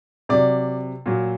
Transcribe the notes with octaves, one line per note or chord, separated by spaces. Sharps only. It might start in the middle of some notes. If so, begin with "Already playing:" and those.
C3 F#3 D5
A#2 F#3